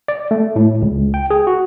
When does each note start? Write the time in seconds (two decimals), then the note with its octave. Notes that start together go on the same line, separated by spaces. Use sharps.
0.08 D5
0.31 A3
0.56 A2
0.82 C#2
1.14 G5
1.30 G#4
1.47 F#4